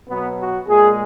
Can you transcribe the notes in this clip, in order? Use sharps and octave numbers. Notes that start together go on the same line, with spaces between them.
B2 F#3 B3
F#4
A#2 G#3 G#4